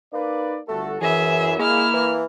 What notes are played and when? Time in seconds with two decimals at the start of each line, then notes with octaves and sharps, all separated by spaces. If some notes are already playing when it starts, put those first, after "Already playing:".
0.13 A#3 D#4 B4 D5
0.68 G1 A3 F#4 A4
1.01 F#2 E3 G#4 E5
1.59 G#3 A#3 E4 F6
1.93 E3